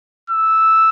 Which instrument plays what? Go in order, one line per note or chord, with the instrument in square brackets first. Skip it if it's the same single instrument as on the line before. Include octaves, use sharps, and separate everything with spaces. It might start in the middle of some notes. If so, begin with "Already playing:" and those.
[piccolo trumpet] E6